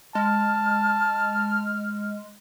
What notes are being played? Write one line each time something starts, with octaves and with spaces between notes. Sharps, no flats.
G#3 A5 F6